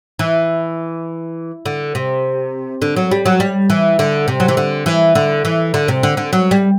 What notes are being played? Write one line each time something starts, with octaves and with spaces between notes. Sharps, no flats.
E3
D3
C3
D3
F#3
G3
F#3
G3
E3
D3
C3
F#3
E3
D3
E3
D3
E3
D3
C3
D3
D3
F#3
G3